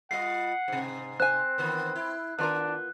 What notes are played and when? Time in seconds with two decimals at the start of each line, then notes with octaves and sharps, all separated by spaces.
0.11 G3 F4 D#5 F#5 C7
0.68 G#2 C3
1.20 C4 C5 G#5 F#6
1.58 D#3 E3 B3
1.95 E4
2.39 D#3 B3 D4 F4 A#4 F#6